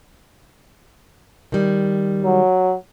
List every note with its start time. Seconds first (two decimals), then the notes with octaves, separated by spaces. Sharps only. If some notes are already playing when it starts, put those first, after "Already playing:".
1.52 D#3 G3
2.24 F#3